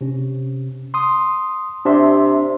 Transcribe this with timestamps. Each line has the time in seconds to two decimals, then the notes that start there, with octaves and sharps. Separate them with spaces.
0.01 C3 C#4
0.94 C6 D#6
1.85 C3 D4 E5 C6